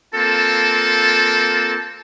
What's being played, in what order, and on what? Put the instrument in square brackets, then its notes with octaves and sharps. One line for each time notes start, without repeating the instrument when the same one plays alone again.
[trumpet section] A#3 C4 F4 A4 A5